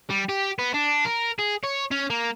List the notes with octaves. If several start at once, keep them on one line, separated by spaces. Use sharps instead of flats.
G3
G4
B3
D4
A#4
G#4
C#5
C#4
A#3